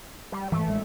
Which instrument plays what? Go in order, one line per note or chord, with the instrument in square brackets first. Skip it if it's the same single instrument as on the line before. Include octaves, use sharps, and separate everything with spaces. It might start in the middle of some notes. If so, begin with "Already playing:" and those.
[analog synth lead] G3
[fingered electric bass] G#2 E3 [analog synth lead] A3
[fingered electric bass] A1 G#3